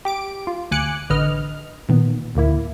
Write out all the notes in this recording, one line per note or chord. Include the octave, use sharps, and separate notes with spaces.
G4 D6 D7
F4
D2 G#5 D6 F#6 C#7
A1 D3 B4 D#5 F6
A#2 D#3 B3
A1 D2 A#3 E4